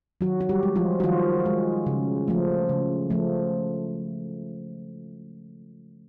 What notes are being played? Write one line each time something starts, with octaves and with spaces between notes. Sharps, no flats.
D#3 F#3 F#4
F#4
G3 G4
G#3
F3 F4
F#4
D#3 F3 F4
G#3
C#3
F3 A3
C#3
F3 A3